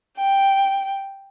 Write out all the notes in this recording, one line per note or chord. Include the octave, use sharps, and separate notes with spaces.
G5